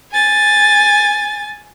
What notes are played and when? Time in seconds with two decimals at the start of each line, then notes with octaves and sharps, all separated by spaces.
0.12 G#5 A6